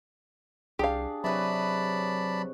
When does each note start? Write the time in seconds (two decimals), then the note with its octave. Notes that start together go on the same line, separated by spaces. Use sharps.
0.79 C2 D4 G4 G#4 F5
1.24 C3 F#3 B4 C#5 D5 A5 B5